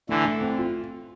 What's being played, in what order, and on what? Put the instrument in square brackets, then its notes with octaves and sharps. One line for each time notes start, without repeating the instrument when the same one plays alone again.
[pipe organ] D3 E3 [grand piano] A3
[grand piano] A3
C4
F4